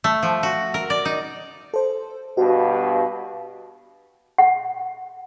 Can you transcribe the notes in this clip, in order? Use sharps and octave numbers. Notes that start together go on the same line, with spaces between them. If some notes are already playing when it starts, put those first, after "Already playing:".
A3
F3
F#4
A#4
D5
D#4
A4 C5
G2 B2 F#4
F#5